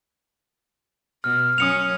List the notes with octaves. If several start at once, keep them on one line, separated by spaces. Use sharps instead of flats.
B2 F6
F#2 C#4 D#6 C#7 F7